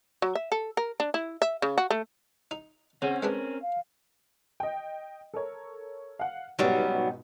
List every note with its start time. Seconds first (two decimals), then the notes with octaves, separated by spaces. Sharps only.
0.22 F#3
0.35 E5
0.52 A4
0.77 A#4
1.00 D4
1.14 E4
1.42 E5
1.62 C#3
1.78 F#4
1.90 A3
2.51 D#4
3.02 C#3 C4 C#4 F#5
3.23 G#3 B3 D4 A#4
3.62 F5
4.60 D#5 G5
5.34 A4 A#4 C#5
6.19 F5 F#5
6.59 C#2 G#2 B2 F#3 G3 B3